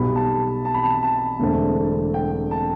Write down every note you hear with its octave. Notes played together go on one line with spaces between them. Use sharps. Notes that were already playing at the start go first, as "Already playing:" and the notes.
Already playing: B1 B2 G3 B3 B5
A5
A5
B5
A5
A5
E1 E2 D3 A3 C4
G5
A5